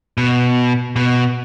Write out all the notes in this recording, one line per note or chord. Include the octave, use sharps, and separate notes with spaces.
B2
B2